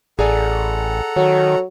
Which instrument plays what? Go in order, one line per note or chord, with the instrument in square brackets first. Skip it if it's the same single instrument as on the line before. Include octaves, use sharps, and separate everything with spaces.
[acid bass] A1 [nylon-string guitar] G#4 D5 G#5 [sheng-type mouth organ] A4 F#5 A#5
[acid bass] D#3 [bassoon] F#3